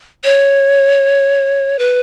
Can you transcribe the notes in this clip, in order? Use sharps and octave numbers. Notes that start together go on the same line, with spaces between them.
C#5
B4